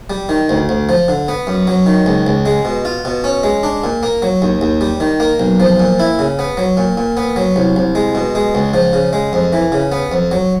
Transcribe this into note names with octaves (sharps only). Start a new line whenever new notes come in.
G3
D#3
D2
D2
F3
D3
B3
F#2
F#3
D#3
C#2
C#2
G#3
B2
F4
B2
C#4
G#3
D4
A#2
A#3
F#3
D#2
D#2
G3
D#3
A#3
B1
F3
A#2
E4
C#3
B3
F#3
A#2
A#2
B3
F#3
C2
C2
G#3
B2
G#3
C#2
F3
C#3
G#3
F2
E3
C#3
B3
F2
F#3